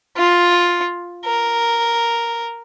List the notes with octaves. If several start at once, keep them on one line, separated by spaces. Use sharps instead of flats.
F4
A#4